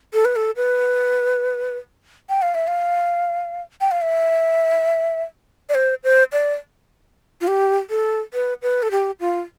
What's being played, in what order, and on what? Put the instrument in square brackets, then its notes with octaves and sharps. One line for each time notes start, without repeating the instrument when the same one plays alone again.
[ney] A4
B4
A4
B4
G5
F5
E5
F5
G5
F5
E5
D5
C5
C5
D5
F4
G4
A4
B4
B4
A4
G4
F4